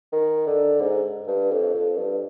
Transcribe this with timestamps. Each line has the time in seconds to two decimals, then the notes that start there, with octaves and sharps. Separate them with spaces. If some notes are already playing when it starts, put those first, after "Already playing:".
0.13 D#3
0.47 D3
0.81 G#2
1.27 G2
1.51 F2
1.75 F2
1.98 G2